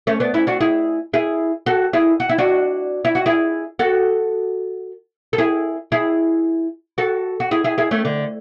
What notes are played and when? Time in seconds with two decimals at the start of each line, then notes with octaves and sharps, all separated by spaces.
0.07 A3 C#4
0.20 B3 D4
0.34 C#4 E4
0.47 D4 F#4
0.60 E4 G#4
1.14 E4 G#4
1.66 F#4 A4
1.93 E4 G#4
2.20 F#4
2.29 E4
2.38 D4 F#4
3.05 E4
3.15 F#4
3.26 E4 G#4
3.79 F#4 A4
5.33 A4
5.38 E4 G#4
5.92 E4 G#4
6.98 F#4 A4
7.40 F#4
7.51 E4 G#4
7.64 E4 G#4
7.78 E4 G#4
7.91 A3 C#4
8.05 D3